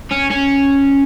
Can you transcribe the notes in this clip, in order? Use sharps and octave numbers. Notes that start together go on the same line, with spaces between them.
C#4
C#4